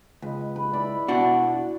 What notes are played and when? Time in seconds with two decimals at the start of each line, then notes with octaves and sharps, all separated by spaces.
0.22 C#2 B4 D#5
0.56 B4
0.72 E4 D5 B5
1.08 B2 D4 F#4